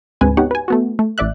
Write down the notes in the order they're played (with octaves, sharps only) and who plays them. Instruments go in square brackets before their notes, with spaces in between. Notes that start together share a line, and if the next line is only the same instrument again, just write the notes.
[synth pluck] D2 G#2 G#3 C4 B4 G#5
B3 D#4 F#4 G4 C#5 F#5
B4 G#5
A3 B3 F#4
A3
A1 D5 E5 F#6